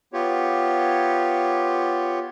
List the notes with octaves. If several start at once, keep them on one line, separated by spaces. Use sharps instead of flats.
B3 F4 G4 C#5